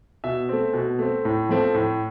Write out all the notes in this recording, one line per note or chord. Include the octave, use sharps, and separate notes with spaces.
B2 E5
A3 C4
B2
A3 C4
A2
F3 A3 C4
A2